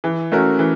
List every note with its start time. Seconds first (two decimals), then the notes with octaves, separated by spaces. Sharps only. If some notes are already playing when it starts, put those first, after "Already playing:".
0.04 E3
0.32 A3 C#4 F#4 A#4
0.59 E3